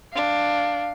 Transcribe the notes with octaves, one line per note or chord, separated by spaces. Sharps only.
D4 F5